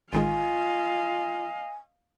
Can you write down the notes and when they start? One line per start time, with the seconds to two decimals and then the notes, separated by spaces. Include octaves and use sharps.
0.13 A1 D#3 G#3 F4 D#5 F5 G#5